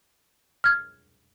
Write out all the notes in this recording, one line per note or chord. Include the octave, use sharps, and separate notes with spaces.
F6 G#6